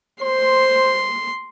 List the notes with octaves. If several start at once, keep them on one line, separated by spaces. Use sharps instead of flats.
C5 C6